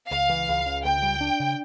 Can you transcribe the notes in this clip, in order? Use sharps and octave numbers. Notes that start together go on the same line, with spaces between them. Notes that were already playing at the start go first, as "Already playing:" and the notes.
C#2 F5
E3
C#2
C#3
C#2 G5
G3
D4
C#3